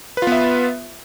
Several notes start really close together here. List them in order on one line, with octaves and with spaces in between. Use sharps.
B4 F4 B3 E5